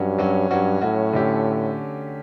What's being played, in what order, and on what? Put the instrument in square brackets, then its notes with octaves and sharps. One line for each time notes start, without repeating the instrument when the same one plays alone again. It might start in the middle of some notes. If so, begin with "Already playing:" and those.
Already playing: [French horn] G2 [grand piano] F#3 C#4 F#4
[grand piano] F#3 C#4 F#4
[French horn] G2 [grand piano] F#3 C#4 F#4
[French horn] A2 [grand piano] F#3 C#4 F#4
[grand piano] D3 A3 C#4 G4